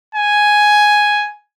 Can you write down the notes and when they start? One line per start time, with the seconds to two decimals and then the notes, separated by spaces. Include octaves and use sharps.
0.15 G#5